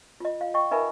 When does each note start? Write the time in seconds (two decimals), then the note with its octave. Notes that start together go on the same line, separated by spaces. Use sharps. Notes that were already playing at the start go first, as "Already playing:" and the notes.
0.20 F4 D#5
0.41 F5
0.54 D#5 G5 C#6
0.71 D#4 A#4 B4 E5 G#5 B5